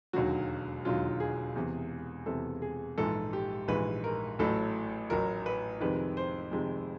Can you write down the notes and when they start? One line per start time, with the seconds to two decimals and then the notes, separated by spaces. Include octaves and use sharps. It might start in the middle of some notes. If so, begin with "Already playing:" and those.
0.13 E1 D#2 D3 F#3 F#4
0.85 E1 D#2 D3 F#3 F4
1.20 G#4
1.55 E2 C3 E3
2.26 E2 C3 E3 A4
2.62 G#4
2.98 A#1 G#2 E3 G#3 A4
3.33 G4
3.68 A#1 G#2 E3 G#3 B4
4.04 A#4
4.39 A1 A2 F#3 A4
5.10 A1 A2 F#3 A#4
5.46 B4
5.81 F2 C3 D#3 G#3 B4
6.17 C5
6.51 F2 C3 D#3 G#3